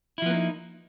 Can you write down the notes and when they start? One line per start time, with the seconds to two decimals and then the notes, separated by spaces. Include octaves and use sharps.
0.18 E4
0.22 F3
0.26 B3
0.30 A#3
0.34 D#4